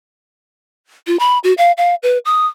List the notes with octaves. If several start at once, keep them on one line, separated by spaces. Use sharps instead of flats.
F4
B5
F#4
F5
F5
B4
D#6